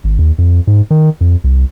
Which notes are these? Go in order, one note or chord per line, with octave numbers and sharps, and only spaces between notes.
G#1
D#2
F2
G#2
D#3
F2
C2